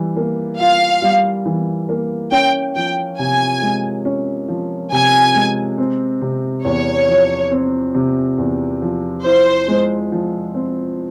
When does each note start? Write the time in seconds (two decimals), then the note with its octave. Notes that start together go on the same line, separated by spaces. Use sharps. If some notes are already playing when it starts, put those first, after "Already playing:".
Already playing: E3 G3
0.16 A#3
0.59 F4 F5
1.02 G3
1.46 E3
1.89 A#3
2.32 C#4 G5
2.76 F3 G5
3.19 C3 G#5
3.62 G#3
4.05 C#4
4.48 F3
4.92 C3 G#5
5.35 G#3
5.78 C4
6.22 C3
6.65 E2 C#5
7.08 F3
7.51 C4
7.95 C3
8.38 E2
8.82 F3
9.25 E4 C5
9.68 G#3
10.12 F3
10.55 C4